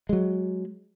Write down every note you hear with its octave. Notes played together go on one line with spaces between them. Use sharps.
F#3 G#3